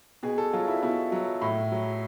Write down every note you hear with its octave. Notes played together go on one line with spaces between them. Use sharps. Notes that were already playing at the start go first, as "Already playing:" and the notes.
B2 G#4
A4
F#3 F4
E4
B2 E4
F#3
A2
F#3